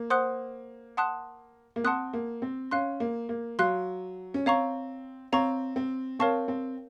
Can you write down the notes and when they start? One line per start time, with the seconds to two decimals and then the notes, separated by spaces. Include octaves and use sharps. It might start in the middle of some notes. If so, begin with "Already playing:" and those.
Already playing: A#3
0.10 C5 F#5 C6 D#6 F#6
0.97 F#5 A5 C6 D#6 F#6
1.76 A#3
1.84 C4 F#5 A5 C6 D#6 F#6
2.13 A#3
2.42 C4
2.71 C#4 F5 C6 F#6
3.00 A#3
3.29 A#3
3.59 F#3 F5 C6 F#6
4.34 C#4
4.46 C4 C#5 F5 A#5 C#6
5.32 C4 C#5 F5 A#5 C#6
5.76 C4
6.19 C4 A#4 C#5 F5 A5 C#6
6.48 C4